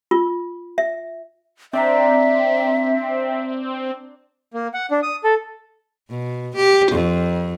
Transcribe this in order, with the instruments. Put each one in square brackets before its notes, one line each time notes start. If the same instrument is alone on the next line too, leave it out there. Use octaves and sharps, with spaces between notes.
[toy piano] F4
E5
[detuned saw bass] C4 [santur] D4 D5 A#5 [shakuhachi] E5
[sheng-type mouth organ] A#3
F#5
D4
D#6
A4
[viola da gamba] B2
G4
F2